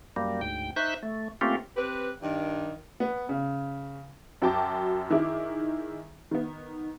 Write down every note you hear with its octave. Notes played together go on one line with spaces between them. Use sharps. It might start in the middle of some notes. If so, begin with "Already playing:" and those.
F#2 G3 A#3
D2 G#2 G5
D#4 C5 E5 C#6 F#6 G6
A3
A3 A#3 C4 C#4 F4 G4
C4 G4 B4
G2 D#3
B3
C#3
F#2 F#4 G5 A5 D6
D#3 E4 G#4 D6
D#3 B3